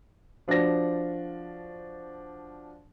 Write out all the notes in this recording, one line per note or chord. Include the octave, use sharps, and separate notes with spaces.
F3 D4 F#4 C5 A#6